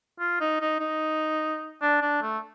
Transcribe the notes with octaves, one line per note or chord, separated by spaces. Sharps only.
F4
D#4
D#4
D#4
D4
D4
A3